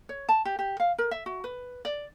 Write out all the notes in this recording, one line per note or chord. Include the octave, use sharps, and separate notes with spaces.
C#5
A5
G4
G4
F5
A#4
E5
F#4
B4
D5